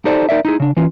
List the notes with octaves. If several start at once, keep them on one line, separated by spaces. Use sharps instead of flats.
D#4 G4 A4 C5 D5
D#4 A#4 D5 E5
D#4 E4 G#4
C#3 D4
E3 C#4 F4